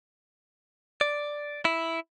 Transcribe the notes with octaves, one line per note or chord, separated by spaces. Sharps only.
D5
E4